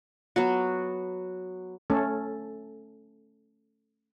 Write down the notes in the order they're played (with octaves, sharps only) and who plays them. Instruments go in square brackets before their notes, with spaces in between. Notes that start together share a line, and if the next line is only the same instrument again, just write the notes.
[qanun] F#3 B3 F#4
[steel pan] A3 C#4 A4